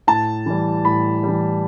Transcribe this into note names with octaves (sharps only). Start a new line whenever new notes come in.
A2 A5
E3 G3
A2 B5
E3 G3